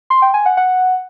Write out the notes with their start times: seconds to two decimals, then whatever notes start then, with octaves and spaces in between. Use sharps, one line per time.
0.10 C6
0.22 G5
0.34 G#5
0.46 F#5
0.57 F#5